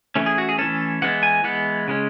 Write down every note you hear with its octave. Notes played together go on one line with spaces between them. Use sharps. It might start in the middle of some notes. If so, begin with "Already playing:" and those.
E3 A3 C#4
G#4
F#4
G#4
E3 A3 C#4 A4
E3 G#3 B3 F#5
G#5
E3 G#3 B3 F#5
C#3 G#3 C#4